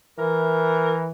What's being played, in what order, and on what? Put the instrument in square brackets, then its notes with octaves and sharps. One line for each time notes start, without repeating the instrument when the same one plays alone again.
[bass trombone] E3 [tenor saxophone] A#4